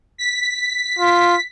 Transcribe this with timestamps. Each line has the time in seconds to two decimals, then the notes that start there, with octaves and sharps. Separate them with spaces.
0.18 B6
0.99 F4